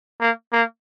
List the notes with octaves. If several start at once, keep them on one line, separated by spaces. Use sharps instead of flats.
A#3
A#3